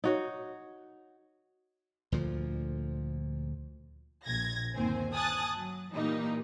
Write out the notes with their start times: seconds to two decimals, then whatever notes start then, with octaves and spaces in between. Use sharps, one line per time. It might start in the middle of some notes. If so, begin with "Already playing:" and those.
0.04 D#4 F#4 C#5
2.12 D2 A#2 F3
4.26 A#1 G#6 A#6
4.74 G1 D#2 C4 C5 G#5
5.12 G#5 A5 D#6 F#6 A6
5.56 F#3
5.95 A#2 E3 G3 A#3 D#4